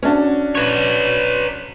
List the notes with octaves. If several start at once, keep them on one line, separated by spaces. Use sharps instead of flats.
C#4 D4 F#4
B4 C#5